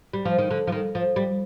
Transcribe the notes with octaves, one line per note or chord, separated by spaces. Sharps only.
G3
F3
D#3
D3
F3
D#3
F3
G3